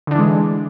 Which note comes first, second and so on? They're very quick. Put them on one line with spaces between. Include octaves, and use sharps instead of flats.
D3 D4 E3 G#3